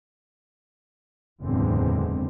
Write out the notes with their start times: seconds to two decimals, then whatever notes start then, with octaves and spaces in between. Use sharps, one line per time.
1.43 F#1 E2 A2 D3 G#3 C4